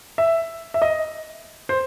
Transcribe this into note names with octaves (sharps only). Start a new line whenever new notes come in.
E5
E5
D#5
C5